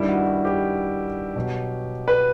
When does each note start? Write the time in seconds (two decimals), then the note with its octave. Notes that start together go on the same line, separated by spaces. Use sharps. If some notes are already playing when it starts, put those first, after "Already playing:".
Already playing: G2 D#3 G3 E4
0.09 F#4
0.26 F#4
0.45 G4
1.35 B2 F#3
2.08 B4